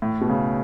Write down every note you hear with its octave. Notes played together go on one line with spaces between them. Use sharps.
A2
B2
C#3